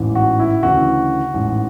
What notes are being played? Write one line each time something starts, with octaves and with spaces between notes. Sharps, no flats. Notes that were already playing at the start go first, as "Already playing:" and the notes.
Already playing: A1 G#2 E3
F#4
E4
D2 C#3 E3 F#4
A1 G#2 E3